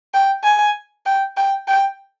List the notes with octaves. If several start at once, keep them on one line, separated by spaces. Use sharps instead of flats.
G5
G#5
G5
G5
G5